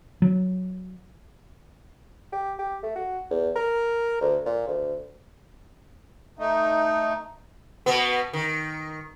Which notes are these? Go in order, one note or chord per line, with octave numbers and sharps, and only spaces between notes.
F#3
G4
G4
A3
F#4
E2
A#4
D2
A#2
D2
A3 D#4
B2 B3
D#3